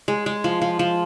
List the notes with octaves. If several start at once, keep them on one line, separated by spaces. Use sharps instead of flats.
G#3
G#3
F3
F3
F3